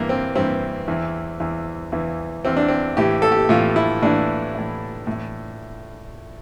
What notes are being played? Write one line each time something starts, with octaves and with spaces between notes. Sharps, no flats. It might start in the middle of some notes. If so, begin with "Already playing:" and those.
Already playing: G2 E3 A#3
C4
G2 E3 C4
E2 E3
E2 E3
E2 E3
E2 E3 C4
D4
C4
A2 E3 G4
A4
G4
A2 E3 F4
E4
A2 E3 D4
A2 E3
A2 E3